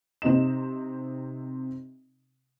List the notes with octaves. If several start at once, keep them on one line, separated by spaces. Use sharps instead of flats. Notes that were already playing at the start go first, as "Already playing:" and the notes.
C3 C4 D#4 D#5 E7